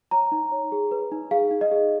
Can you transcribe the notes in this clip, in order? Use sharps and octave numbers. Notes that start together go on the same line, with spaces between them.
C#5 A#5
D#4
C#5
G#4
B4
D#4
G#4 F5
D#4
D#5
G#4